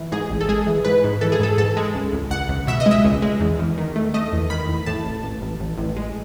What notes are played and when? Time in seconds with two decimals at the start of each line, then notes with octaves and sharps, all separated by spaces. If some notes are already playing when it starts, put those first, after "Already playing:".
Already playing: E3
0.12 G#2 G#4
0.30 A1
0.41 A4
0.48 G#3 G#4
0.67 E3
0.84 G#2 B4
1.04 G#2
1.21 E3 A4
1.32 G#4
1.40 G#2 A4
1.57 G#2 A4
1.77 G#3
1.95 C#2
2.13 C#2
2.31 C#2 F#5
2.49 C#2
2.67 B2 E5
2.80 D#5
2.86 G#3
2.91 E5
3.05 C#2
3.22 G#3
3.40 E2
3.59 E2
3.78 D#3
3.96 A3
4.14 A3 D#5
4.33 E2
4.50 D#3 B5
4.69 E2
4.86 A2 A5
5.05 A1
5.24 A1
5.41 A1
5.60 A1
5.78 A1
5.96 G#3